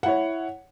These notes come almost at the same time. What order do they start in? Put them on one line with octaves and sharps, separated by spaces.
F#5 E4 C#5